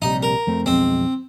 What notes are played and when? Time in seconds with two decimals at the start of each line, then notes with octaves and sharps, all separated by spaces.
0.02 A#1 C3 G3 D#4
0.23 A#4
0.47 F2 A3 C4
0.66 B1 F2 G#3 C4